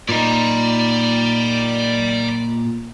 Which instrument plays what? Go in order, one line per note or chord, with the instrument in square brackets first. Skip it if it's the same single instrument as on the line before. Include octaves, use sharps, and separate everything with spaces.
[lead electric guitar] A#2 D#4 [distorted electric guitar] D5 B5